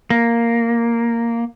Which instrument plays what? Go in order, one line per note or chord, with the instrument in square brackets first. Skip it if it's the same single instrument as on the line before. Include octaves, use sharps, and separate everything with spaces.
[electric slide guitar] A#3